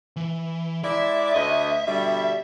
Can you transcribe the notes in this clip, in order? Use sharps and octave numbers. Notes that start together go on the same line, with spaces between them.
E3
G#3 E4 D5 E5
D2 D#5
B2 D3 G3